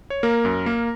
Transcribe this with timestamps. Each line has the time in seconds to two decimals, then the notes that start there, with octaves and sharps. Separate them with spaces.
0.10 C#5
0.23 A#3 A#4
0.45 F#2
0.66 A#3